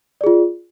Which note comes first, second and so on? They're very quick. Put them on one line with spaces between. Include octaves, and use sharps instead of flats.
D5 G#4 F4